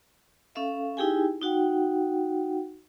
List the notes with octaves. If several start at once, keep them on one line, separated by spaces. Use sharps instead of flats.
C#4 A4 E5 F5
D#4 E4 G4 G#4 G5 G#5
D#4 F#4 F#5 G5